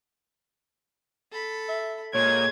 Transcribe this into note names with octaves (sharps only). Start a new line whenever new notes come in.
A4 B5
E5
A#2 G#3 G#4 C#5 G#6